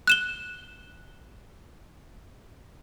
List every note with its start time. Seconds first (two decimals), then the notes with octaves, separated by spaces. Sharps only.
0.07 F#6 E7 G7